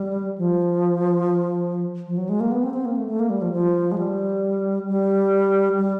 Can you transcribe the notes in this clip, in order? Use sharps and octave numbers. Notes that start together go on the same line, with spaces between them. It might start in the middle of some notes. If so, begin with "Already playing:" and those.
Already playing: G3
F3
F3
F#3
G#3
A#3
B3
C4
C4
A#3
A3
A3
A#3
G3
F3
F3
G#3
G3
G3
G3